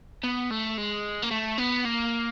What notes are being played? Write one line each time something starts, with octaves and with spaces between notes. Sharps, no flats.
B3
A3
G#3
A#3
A3
B3
A#3